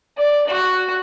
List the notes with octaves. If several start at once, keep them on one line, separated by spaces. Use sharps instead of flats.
D5
F#4